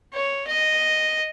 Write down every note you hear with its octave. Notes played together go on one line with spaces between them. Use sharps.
C#5
D#5